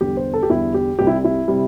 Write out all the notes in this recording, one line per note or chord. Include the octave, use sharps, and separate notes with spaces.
E2 D3 G3 G4
C5
A4
G4
E2 D3 G3 E4
G4
C2 C3 G3 G4
E4
E4
C3 G3